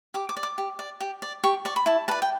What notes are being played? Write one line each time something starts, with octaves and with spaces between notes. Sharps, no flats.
G4 D6
D6
D5
D6
G4
D5
G4
D5
G4 C#6
D5 C#6
B5
E4 A5
B4 D5 A5
G5